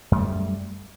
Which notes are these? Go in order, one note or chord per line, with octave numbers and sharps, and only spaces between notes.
F#2 G3 A3